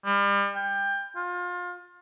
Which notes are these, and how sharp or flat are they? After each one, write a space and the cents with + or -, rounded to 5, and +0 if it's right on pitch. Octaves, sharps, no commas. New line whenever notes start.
G3 +35
G5 +20
F4 +30